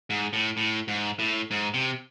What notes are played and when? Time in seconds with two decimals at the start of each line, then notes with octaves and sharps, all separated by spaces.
0.10 G#2
0.33 A2
0.57 A2
0.88 G#2
1.19 A2
1.51 G#2
1.74 C3